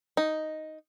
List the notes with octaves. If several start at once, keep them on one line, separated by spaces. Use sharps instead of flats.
D#4